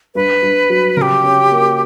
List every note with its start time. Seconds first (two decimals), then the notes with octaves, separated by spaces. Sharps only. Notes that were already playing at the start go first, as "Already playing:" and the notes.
0.15 G2 B4
0.42 G2
0.70 F#3
0.97 C#3 A#4
1.02 G4
1.24 C#4
1.50 A#3